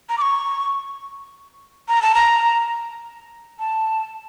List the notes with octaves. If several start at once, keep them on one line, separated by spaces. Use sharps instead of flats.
A#5
D6
C#6
A#5
A5
A#5
A5